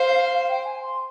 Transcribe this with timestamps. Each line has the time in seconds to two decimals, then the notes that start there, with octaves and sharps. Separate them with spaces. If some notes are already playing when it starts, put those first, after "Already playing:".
Already playing: C5 F5
0.47 G5
0.64 G#5
0.81 C6